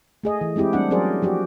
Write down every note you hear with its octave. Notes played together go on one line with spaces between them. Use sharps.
A3 G#4 D#5
E3
G#3 C4 E4 G4
G3 A3 C4 D4 F#5
F#3 C#4 G#4 A#4 C5 D5
F3 F#4 G4